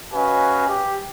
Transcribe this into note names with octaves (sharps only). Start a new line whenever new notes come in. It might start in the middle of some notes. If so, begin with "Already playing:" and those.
C#4 F#4 B4 D#5 F5 G#5
G4